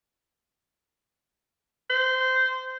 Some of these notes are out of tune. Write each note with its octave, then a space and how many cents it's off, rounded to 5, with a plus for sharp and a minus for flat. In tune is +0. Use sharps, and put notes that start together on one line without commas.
C5 -15